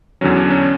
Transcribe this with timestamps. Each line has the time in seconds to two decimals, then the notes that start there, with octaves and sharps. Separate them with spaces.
0.21 E2 D3 F#3 C#4
0.36 D4
0.50 C#4